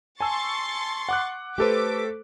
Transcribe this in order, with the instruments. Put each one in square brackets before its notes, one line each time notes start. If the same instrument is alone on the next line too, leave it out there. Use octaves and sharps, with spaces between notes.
[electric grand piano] G#5 A5 E6 [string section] C6 C#6 A6
[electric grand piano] F#5 D6 F#6
[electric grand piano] A3 A4 C5 [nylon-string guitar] G4 B4 [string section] D6 B6